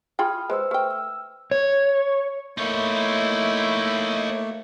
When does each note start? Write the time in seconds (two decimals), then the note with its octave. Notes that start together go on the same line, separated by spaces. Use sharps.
0.19 F4 G#4 G5 B5 D#6 F6
0.50 G#3 B4 C5 E6
0.71 A3 G5 F6
0.91 E6
1.51 C#5
2.58 A3 A#3 D#4 E4 C#5